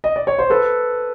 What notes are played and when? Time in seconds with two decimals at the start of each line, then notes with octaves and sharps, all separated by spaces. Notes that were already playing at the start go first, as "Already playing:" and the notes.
0.04 D#5
0.16 D5
0.27 C#5
0.39 C5
0.50 A4 B4